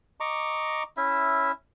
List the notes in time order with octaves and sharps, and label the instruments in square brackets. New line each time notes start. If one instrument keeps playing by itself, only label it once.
[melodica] D#5 A#5 C#6 D6
C#4 E4 E5